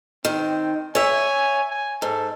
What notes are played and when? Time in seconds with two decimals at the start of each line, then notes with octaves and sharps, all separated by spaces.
0.25 D#3 C4
0.95 C#5 E5 G#5
1.70 G#5
2.02 G#2 A4